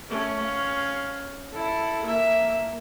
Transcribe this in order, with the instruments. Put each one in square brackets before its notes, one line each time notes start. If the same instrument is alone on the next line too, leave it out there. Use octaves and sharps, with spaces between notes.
[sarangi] A3 [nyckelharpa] C#4
[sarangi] F5
[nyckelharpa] E4 [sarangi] A4
[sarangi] A#3 [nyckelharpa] E5